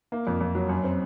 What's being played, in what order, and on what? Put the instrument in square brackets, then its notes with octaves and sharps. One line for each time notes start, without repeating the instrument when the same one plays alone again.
[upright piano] A#3
F2
F2
F#3
F#2
C4